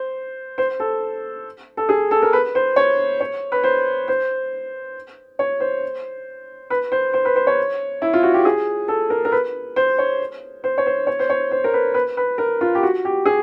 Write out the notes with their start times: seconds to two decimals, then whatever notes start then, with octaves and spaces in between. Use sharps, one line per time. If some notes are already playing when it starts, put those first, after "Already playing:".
Already playing: C5
0.58 C5
0.80 A4
1.77 A4
1.89 G#4
2.11 A4
2.22 A#4
2.33 B4
2.55 C5
2.76 C#5
3.20 C#5
3.52 B4
3.64 C5
4.08 C5
5.39 C#5
5.60 C5
6.70 B4
6.92 C5
7.14 C5
7.25 B4
7.36 C5
7.47 C#5
8.02 E4
8.13 F4
8.23 F#4
8.34 G4
8.45 G#4
8.88 A4
9.10 A#4
9.25 A#4
9.32 B4
9.76 C5
9.98 C#5
10.64 C5
10.78 C#5
10.86 C5
11.07 C#5
11.19 C5
11.30 C#5
11.51 C5
11.64 A#4
11.74 B4
11.94 B4
12.17 B4
12.38 A#4
12.61 F4
12.75 G4
12.83 F#4
13.05 G4
13.26 G#4